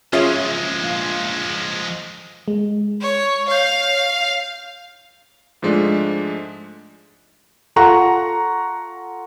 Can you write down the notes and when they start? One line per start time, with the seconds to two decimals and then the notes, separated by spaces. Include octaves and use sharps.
0.13 F#1 F3 G#3 C#4 F4 G#4 E5 F#7
0.81 A#1 F5
1.43 F#7
2.48 G#3
3.01 C#5
3.48 C#5 F5 G6
5.62 G#2 F3 G#3 A3 D4
7.76 F4 A4 F#5 A#5 C#6